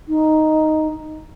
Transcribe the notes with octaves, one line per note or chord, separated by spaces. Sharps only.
D#4